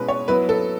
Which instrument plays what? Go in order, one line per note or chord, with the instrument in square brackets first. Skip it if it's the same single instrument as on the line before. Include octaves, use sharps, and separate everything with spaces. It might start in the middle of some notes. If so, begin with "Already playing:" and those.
Already playing: [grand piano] B2 G#3 C#4 E4 [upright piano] B4
[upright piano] C#5
[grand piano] F#3 B3 E4 [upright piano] B4
[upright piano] A4